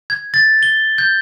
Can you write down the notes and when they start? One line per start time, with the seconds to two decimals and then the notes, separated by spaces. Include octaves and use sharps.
0.10 G#6
0.34 A6
0.63 G7
0.98 G6